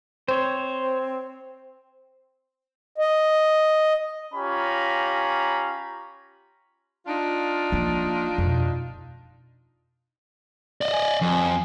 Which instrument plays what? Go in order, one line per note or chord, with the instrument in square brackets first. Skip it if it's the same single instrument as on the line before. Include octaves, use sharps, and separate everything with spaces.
[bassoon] C4 [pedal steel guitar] C5 C#5
[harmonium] D#5
[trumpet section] C#4 F4 G4 A#5 B5
[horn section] D4 D#4 F4
[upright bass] F3 A#3
F2 B2
[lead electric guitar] D5 D#5
[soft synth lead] G#5
[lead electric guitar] F2